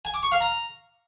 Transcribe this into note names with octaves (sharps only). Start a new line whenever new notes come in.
G#5
D6
C#6
F5
A#5